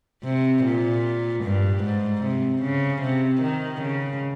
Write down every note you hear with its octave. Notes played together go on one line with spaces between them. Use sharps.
C3
A#2
G2
G#2
C3
C#3
C3
D#3
C#3